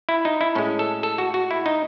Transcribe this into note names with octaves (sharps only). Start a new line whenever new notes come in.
E4
D#4
E4
A2 G#3 C#4
A4
A4
F#4
F#4
E4
D#4